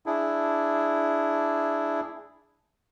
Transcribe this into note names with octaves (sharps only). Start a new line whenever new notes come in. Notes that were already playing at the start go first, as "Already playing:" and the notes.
D4 E4 G#4